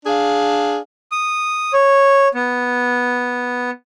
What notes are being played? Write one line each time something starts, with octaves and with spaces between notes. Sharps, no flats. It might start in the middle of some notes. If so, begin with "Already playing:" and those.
D4 G#4 F5
D#6
C#5
B3